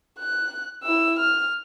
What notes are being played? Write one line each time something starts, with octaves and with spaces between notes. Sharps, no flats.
F#6
E4 E6
F6